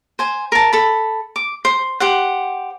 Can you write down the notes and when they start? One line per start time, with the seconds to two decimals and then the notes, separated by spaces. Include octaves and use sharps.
0.19 C5 G#5
0.52 A#4 A5
0.73 A4 B5
1.36 D6
1.65 C5
2.00 G4 C5 F#5